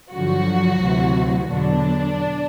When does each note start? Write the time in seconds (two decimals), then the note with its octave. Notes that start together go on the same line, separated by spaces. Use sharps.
0.12 G2 D3 F3 F#3 F#4
0.82 D2 C3 E3
1.51 E2 B2 D3 F#3 D4